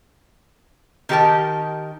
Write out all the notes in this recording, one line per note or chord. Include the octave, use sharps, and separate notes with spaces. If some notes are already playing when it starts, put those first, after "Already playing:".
D#3 D#4 G4 A4 A#4 A5